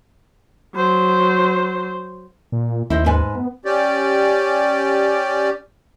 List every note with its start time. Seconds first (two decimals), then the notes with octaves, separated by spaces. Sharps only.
0.75 F#3 C5
2.52 A#2
2.90 D#2 E4 C5 D#5
3.06 G#2 B4 G#5
3.35 B3
3.65 C#4 G4 D5